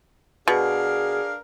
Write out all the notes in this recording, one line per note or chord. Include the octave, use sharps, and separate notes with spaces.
B2 D4 G#4 A#4 F5